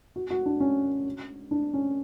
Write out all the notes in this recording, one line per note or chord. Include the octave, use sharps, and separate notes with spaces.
F#4
F#4
D4
C#4
D4
C#4